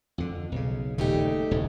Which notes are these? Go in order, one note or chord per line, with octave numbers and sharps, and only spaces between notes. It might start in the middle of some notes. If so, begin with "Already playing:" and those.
F2 D3
B1 C#3
D#1 C#3 A3 D#4 G4
D#1 C#2 A2